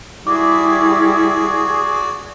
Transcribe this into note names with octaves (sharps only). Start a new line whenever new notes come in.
G3 E4 F#4 G#4 D5 D6